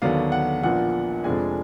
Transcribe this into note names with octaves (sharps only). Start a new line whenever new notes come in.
D#2 D3 F#3 B3 D4 F5
F#5
A#1 A#2 F3 B3 D4 F#5
F1 F2 F3 G#3 D4 G#5